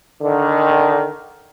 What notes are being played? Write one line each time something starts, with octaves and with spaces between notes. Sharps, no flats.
D3 D#3